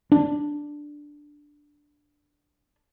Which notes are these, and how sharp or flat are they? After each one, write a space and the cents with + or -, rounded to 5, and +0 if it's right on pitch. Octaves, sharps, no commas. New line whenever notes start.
D4 +0